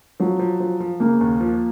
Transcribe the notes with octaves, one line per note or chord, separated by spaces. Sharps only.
F3 F#3
F3
F3
F3
C#3 A#3
D#2
F3